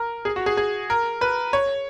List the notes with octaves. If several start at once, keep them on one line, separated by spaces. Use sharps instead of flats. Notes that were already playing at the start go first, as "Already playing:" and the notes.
Already playing: A#4
G#4
F#4
G#4
G#4
A#4
B4
C#5